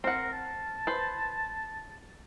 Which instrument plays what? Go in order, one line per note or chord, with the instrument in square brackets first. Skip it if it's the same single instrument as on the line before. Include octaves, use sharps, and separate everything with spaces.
[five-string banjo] C4 F#5 [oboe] A#4
[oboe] A5
[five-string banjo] B4 C5